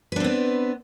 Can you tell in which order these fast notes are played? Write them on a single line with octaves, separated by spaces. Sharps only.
B4 D4 C4 B3